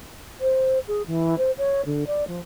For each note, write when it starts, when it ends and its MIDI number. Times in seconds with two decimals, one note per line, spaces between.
0.40 0.78 72
0.87 1.02 68
1.06 1.37 52
1.38 1.51 72
1.58 1.81 73
1.85 2.04 50
2.07 2.24 74
2.27 2.40 53